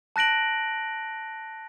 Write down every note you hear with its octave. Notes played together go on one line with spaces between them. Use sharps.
A5 F#6 A#6 D7 F#7